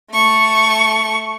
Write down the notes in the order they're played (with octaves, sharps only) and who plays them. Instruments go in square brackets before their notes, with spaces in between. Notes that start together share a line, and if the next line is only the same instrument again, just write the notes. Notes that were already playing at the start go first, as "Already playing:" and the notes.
[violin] A3 C#6